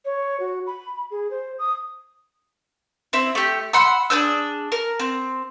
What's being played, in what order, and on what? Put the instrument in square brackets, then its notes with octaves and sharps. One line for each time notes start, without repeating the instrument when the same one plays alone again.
[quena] C#5
F#4
B5
G#4
C5
D#6
[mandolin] C4 E4
A3 G4
F#5 B5 C6 E6
D4 G#4 C5 E6
A#4
C4